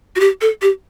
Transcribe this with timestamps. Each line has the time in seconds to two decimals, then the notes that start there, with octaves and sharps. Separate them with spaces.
0.16 F#4
0.20 G4
0.41 A4
0.62 G4